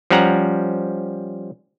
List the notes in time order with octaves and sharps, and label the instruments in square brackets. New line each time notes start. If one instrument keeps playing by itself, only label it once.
[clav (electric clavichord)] F3 G3 C#4 F#5 A#5